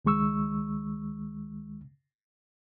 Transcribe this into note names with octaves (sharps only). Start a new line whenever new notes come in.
C#2 D#3 G#3 C#6 E6